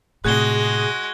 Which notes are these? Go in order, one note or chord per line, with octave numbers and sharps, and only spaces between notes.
A2 C3 G#3 F#4 G#4 F#6 G#6 G7